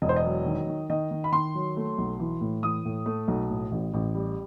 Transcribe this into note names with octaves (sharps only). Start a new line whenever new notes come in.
E1 D#5
C5
D#5
F#3
D#3
D#3
D#3 D#5
D#3
B5
D#3 C6
F#3
A3
B1
E3
A2
E3 D#6
A2
A3
B1
A2
A1
A1
G3